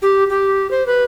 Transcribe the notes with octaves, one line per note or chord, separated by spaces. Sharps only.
G4
G4
C5
B4